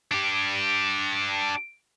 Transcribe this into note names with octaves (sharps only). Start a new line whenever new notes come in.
D4 G4